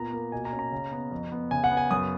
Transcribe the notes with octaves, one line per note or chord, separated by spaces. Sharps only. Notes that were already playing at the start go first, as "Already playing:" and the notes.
Already playing: A#2 B3 A#5
A#3
B2 G#5
A#5
C#4
A#5
C#3
B3
F2
B3
C#3 G#5
F#5
B3
G#5
F#2 D#6